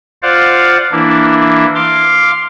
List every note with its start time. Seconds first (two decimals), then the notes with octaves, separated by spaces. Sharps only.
0.23 F4 C5 D5 F5 F#5
0.92 E3 A#3 D4 E4
1.75 F5 C6 D6